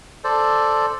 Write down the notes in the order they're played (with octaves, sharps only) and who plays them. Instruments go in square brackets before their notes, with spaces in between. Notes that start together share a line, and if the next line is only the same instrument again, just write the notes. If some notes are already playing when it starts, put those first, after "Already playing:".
[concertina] A4 C5 D5